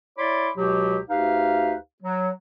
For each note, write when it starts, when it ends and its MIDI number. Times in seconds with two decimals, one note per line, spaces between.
0.18 0.49 64
0.18 0.49 73
0.18 0.49 74
0.18 0.49 83
0.18 0.49 84
0.18 0.49 86
0.57 0.99 37
0.57 0.99 47
0.57 0.99 54
0.57 0.99 67
1.09 1.74 38
1.09 1.74 63
1.09 1.74 67
1.09 1.74 71
1.09 1.74 77
2.03 2.29 54